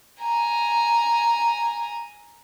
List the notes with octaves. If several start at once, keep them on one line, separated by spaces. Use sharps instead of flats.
G#5 A#5